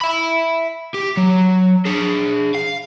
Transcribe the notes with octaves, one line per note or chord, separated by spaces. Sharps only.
E5 B5
G4
F#3
D4 G#4
F5